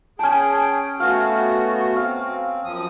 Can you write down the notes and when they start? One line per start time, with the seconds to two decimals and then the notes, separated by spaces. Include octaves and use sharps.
0.19 C#4 G#4 G5 A5
1.00 A3 B3 F#4 F5
1.96 C4 F5
2.64 F#2 F3 D#6